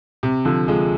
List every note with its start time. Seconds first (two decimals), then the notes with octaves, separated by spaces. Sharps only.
0.23 C3
0.45 D3 F3
0.68 F3 G#3